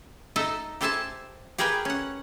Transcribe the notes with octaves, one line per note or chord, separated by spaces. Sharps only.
D#4 A4 D#5 E5
G4 A4 C5 E5 G#5 A5
G4 G#4 A#4 B4 G5 G#5
C#4 F#5